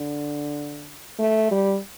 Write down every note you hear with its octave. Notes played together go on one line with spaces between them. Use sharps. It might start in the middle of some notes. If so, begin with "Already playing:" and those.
Already playing: D3
A3
G3